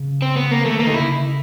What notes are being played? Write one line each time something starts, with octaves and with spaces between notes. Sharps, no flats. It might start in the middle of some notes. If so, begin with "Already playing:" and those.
Already playing: C#3
C4
B3
A#3
D#3 A3
D3 A#3
D#4
C#3 E4
C#3